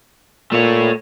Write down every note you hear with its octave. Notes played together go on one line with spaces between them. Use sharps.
A#2 A3 C#5